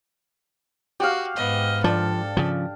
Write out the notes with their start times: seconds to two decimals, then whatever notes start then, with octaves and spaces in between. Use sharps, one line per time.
1.00 F#4 G4 F5
1.36 G#2 B3 D#5
1.84 F3 D4 A4
2.37 C#3 F3